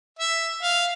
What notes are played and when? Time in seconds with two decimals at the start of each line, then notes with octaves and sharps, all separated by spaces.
0.19 E5
0.63 F5